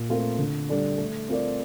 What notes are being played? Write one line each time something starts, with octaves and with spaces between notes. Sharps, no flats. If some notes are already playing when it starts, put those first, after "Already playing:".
Already playing: A#2
A3 C4 F4 A#4
D3
G3 D4 A4 D5
A3
C4 F4 A#4 D5